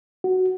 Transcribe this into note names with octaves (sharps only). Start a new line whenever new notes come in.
F#4